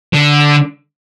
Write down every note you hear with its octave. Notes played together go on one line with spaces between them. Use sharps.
D3